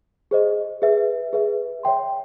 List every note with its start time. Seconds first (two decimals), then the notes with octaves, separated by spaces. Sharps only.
0.31 G#4 C5 D#5
0.82 G#4 B4 E5
1.33 G#4 B4 E5
1.83 C#5 E5 G5 C6